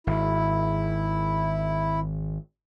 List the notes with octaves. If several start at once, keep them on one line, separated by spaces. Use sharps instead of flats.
G#1 E4